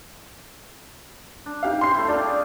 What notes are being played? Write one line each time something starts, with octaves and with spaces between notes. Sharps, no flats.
D4
D#4 G4 F5
C4 C#4 C6 C7
A3 E4
D4 F4 G4 A#4
G#4